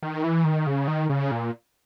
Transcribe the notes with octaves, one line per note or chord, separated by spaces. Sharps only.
D#3
E3
D#3
C#3
D#3
C#3
A#2